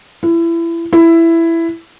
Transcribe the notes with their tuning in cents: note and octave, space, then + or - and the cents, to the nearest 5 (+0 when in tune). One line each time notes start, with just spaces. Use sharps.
E4 +25
E4 +10